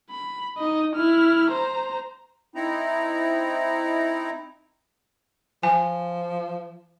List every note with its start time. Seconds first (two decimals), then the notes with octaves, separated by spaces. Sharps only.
0.11 B5
0.58 D#4 D#5
0.96 E4 F6
1.51 C5 A#5
2.55 C4 D#4 E4 A#5
5.63 F3 G#5